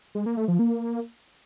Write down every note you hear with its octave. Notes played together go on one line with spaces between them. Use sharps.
G#3
A#3
A3
F3
A#3